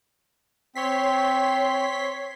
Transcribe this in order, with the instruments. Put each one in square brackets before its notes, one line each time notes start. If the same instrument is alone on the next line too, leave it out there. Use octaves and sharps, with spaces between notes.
[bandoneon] C4 [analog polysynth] C#5 C6 B6